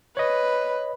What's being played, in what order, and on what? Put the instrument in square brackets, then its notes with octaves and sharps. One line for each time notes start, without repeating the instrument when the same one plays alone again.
[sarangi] B4 [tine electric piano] C#5 D#5